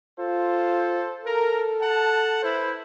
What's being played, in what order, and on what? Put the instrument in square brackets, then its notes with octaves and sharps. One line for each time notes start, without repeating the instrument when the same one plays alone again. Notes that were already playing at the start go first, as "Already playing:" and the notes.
[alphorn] F4 [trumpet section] A4 C5
[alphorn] A4 [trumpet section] A#4
[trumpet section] F#5 A5
E4 B4 C5